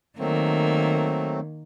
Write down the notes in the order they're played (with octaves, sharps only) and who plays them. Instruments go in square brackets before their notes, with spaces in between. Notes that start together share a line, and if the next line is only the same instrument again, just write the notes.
[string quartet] D#3 A#3 [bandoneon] F#3 A3 C4